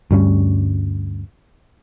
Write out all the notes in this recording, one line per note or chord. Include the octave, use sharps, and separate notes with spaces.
D2 G2 G3 C#4